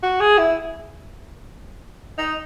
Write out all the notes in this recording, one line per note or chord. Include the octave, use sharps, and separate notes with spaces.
F#4
G#4
E4
D#4